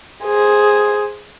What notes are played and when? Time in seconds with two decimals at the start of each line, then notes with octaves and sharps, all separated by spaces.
0.25 G#4 C5